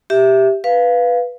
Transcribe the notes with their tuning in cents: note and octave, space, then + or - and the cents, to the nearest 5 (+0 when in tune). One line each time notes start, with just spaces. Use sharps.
G4 +0 E5 +0
B4 +0 F5 +0